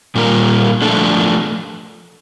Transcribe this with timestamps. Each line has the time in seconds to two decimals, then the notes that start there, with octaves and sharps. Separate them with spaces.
0.15 A#2 G3 A#3 F4 A#4
0.82 F3 A3 D4 A4